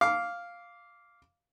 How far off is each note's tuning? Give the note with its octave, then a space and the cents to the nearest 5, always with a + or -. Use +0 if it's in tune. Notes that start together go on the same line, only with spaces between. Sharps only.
F5 +0 D6 -15